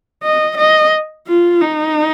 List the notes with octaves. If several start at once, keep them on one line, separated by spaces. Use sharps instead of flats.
D#5
D#5
F4
D#4